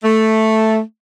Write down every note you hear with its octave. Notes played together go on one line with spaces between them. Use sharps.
A3